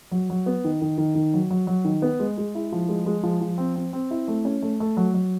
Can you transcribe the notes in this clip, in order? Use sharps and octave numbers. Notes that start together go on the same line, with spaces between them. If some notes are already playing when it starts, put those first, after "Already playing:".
F#3
F#3
B3
D#3
D#3
D#3
D#3
F#3
F#3
F#3
D#3
B3
G#3
G#3
E4
F3
G#3
G#3
F3
F3
C4
C4
C4
E4
A3
C#4
A3
A3
F#3
F#3